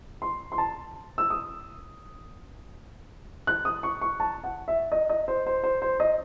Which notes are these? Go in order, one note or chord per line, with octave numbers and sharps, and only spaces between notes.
C6
C6
A5
E6
D#6
F#6
D#6
C#6
C#6
A5
F#5
E5
D#5
D#5
C5
C5
C5
C5
D#5